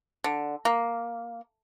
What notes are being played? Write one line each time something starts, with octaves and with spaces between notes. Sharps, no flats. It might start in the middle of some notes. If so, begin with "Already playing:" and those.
D3
A#3